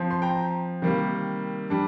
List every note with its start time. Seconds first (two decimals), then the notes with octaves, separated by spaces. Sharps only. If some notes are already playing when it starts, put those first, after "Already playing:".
Already playing: F3 C4
0.10 C6
0.22 G5 A#5
0.82 C3 D#3 G3 A#3
1.70 G3 D4